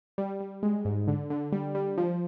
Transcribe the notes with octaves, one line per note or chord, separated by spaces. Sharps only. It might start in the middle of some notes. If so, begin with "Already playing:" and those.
G3
G3
G#3
G#2
D3
D3
G3
G3
F3